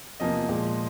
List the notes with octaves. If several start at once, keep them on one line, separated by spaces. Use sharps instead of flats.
E2 C3 F3 A#3 D#5
A#2 F3 G#3